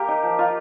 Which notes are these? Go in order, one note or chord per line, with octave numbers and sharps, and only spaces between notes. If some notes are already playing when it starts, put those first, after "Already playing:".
Already playing: A#3 G4 A#4
D#4
F3
D#4 F4